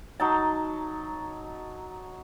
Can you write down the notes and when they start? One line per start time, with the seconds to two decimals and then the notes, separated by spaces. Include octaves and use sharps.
0.20 F#3 D#4 A5